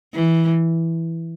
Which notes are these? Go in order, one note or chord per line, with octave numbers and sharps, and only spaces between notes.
E3